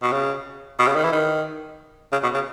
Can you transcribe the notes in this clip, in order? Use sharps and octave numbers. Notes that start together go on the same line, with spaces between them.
B2
C#3
B2
C#3
D#3
E3
D#3
C#3
B2
C#3